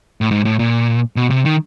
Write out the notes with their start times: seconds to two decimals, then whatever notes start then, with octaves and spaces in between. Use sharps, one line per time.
0.21 A2
0.31 G#2
0.45 A2
0.59 A#2
1.16 B2
1.30 C3
1.45 D#3